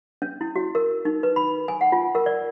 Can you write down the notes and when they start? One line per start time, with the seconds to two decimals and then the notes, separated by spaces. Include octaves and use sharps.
0.22 C#4
0.41 E4
0.56 F#4
0.75 A#4
1.05 D#4
1.23 B4
1.36 B5
1.68 G#5
1.81 F#5
1.92 F4
2.15 A#4
2.26 D5